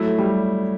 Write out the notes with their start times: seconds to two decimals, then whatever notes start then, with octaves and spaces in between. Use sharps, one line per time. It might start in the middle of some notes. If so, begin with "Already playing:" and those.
Already playing: F#3 A3 E4
0.18 G3